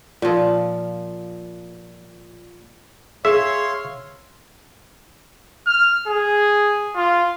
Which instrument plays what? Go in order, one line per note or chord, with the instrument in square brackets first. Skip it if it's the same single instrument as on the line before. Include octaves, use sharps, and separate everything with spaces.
[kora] A#2 F3
[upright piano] G#4 [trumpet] C#5 [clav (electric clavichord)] E5 [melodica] F5 C6
[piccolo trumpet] F6
G#4
F4